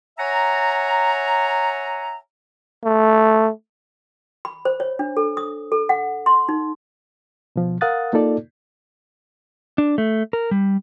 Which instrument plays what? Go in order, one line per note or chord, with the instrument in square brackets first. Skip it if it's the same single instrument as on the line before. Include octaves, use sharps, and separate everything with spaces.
[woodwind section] C#5 E5 F#5 G#5 A#5
[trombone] A3
[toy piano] B5
C5
C#5
D4
A4
D#6
A4
F#5
C6
D#4
[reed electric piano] B2 F3
A#4 F5 F#5 D#6 F#6 A6
A#3 D#4 F4 A4 D5
[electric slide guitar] D4
A3
A#4
G3